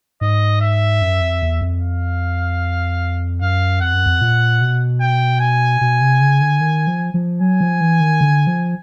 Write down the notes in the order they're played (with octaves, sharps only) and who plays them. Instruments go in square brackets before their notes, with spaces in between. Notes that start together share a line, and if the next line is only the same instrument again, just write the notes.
[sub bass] G#2 [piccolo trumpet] D#5
[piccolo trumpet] E5
[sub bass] F#2
F2
E2
F2
[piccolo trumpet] F5
[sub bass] F#2 [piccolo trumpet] F5
[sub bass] F2 [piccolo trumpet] F#5
[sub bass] F#2
F2
A#2
B2
[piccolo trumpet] G5
G#5
[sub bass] B2
C3
C#3
D3
D#3
F3
F3
[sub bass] F#3 [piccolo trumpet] G#5
[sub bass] F3
E3
D#3
D3
F3